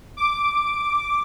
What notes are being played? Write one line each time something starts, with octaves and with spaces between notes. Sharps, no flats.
D6